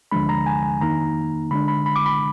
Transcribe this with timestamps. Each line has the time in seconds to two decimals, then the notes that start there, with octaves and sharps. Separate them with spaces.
0.11 D2 D3 F3 G#3 D4 B5
0.29 A#5
0.46 G#5
0.81 F2 D#3 A#3 D#4 A#5
1.51 D3 G#3 D4 B5
1.68 B5
1.86 B5
1.96 D6
2.06 B5